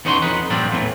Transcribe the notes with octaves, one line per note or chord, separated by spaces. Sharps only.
E2 B3 C#4 D#4 F#4 C6
F2 D#4 B4 F#5
G2 A#2 F3 C4 D4
E2 A2 D#3 E3